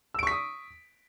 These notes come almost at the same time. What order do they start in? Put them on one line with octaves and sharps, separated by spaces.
E6 D7 C#6 B6 D#6